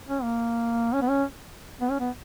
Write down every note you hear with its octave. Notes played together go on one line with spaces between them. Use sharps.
C#4
A#3
C#4
B3
C#4
B3
C#4
B3